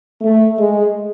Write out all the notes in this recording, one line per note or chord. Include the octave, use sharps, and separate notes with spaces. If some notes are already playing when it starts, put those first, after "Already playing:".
A3
G#3